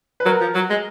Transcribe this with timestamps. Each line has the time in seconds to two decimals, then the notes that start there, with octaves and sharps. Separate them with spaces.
0.20 B4
0.25 F#3 A#4
0.41 F3
0.55 F#3
0.70 G#3